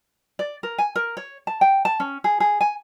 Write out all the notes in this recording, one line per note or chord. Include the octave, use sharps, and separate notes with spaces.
D5
A#4
G#5
A#4
C#5
A5
G5
A5
C#4
G#4
G#4
G#5